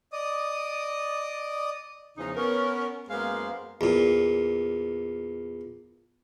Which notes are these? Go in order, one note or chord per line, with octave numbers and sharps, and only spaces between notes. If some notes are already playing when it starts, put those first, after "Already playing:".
D5 D#5 D#6
E2 C#3 F3 D#4
B3 C#4 A#4
F#2 G#3 A#3 B3 C5 F5
E2 A#2